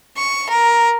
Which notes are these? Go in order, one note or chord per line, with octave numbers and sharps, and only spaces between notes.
C#6
A#4